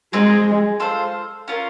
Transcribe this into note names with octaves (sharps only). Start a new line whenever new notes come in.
G#3 C4 D#4 G#4
F4 A4 C5
C#4 F4 A#4